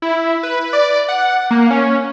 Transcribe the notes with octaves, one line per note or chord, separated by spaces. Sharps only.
E4
B4
D5
F#5
A#3
C#4